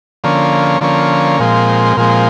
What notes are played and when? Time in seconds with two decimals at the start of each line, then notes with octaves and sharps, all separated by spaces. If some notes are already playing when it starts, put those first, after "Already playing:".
0.24 D3 F3 A#3 C#4
0.81 D3 F3 A#3 C#4
1.39 A#2 F3 G#3 C4
1.97 A#2 F3 G#3 C4